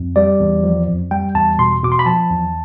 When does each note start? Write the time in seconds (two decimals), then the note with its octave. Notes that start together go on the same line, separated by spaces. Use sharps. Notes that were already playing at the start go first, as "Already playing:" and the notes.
Already playing: F2
0.16 G3 D5
0.40 E2
0.63 F3
0.88 F2
1.11 G3 G5
1.35 E2 A5
1.59 B2 C6
1.83 B2 D6
1.92 C6
1.99 B5
2.06 F3 A5
2.30 E2